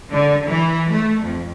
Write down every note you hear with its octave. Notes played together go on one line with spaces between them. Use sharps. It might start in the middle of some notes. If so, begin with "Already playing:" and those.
D3
E3
A3
F2